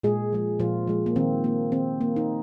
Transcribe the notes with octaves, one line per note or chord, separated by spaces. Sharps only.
A#2 G#3 G#4
F3 G#3
A#2 F3 F4
F3 G#3
A#3
D#3 C4
A#3
D#3 C4
A#3
D#4